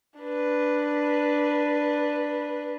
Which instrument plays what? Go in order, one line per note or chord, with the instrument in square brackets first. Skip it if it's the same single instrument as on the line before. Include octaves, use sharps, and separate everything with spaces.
[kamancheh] D4 B4